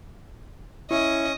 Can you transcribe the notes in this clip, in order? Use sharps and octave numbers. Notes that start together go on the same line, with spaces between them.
C#4 E4 D#5 C#6